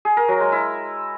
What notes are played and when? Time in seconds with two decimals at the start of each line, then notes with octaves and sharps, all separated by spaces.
0.05 G#4
0.17 A#4
0.29 F#3
0.40 G#3
0.52 E4